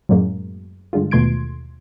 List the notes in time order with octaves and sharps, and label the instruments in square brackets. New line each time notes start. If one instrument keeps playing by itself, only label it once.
[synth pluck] F#2 A2 F#3 G#3 A#3
G2 D3 G#3 F4
D#2 B2 A3 C6 G#6 D7